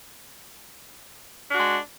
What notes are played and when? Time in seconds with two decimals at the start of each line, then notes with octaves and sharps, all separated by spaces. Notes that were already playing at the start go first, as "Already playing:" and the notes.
1.50 D4
1.55 F#4
1.60 G#3